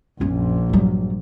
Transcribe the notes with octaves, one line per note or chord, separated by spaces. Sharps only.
A#1 F#2 C#4
G2 F#3